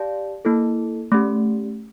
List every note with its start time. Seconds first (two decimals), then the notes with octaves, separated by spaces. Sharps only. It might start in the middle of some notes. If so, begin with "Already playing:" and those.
Already playing: G4 D5 F5 A5
0.45 A#3 E4 A4
1.12 A3 C#4 G4